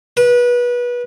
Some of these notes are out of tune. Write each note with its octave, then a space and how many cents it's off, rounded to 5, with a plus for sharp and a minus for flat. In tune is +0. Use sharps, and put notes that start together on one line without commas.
B4 -25